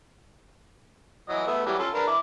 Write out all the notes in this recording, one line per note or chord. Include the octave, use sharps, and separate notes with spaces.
E3 F#3 D#5
A3 B3 E5
E3 F#3 G3
C#4 F4 A4
D4 A#4 B4
E4 D6